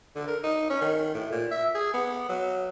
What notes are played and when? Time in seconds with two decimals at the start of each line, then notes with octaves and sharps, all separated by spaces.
0.15 D3
0.27 A#4
0.43 D#4
0.70 C#4
0.81 D#3
1.14 A2
1.32 A#2
1.51 E5
1.75 G#4
1.94 B3
2.29 F#3